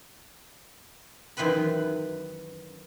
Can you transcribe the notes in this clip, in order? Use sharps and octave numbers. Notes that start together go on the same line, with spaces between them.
F#2 D#3 E3 C4 B4 B5